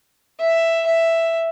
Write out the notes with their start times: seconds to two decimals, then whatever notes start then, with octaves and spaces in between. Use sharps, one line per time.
0.40 E5
0.87 E5